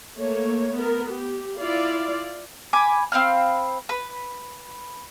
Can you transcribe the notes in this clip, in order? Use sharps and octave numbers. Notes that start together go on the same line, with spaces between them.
A3 A#3 C#5
B3 A#4
G4
E4 F4 D5 F5
G#5 B5 D6
C4 F5 B5 F6
B4 B5